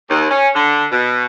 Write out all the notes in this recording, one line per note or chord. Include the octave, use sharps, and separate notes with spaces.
D#2
C#4
D3
B2